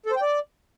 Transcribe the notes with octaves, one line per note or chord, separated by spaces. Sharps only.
A4
C5
G5
D5